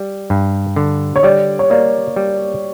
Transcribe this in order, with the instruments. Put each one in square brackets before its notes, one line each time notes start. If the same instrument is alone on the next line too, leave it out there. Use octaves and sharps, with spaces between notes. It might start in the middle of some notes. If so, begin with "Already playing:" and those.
Already playing: [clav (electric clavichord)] G3
G2
D3
[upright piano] C#5
[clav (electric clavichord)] G3 [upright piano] D5
[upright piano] C#5
[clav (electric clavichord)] A#3 [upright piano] D5
[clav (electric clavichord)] G3